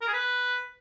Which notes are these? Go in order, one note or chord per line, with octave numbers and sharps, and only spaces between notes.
A#4
G#4
B4